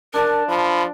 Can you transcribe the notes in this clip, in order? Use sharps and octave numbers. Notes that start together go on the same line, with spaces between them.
D4 A#4 D5 A5
F3 B5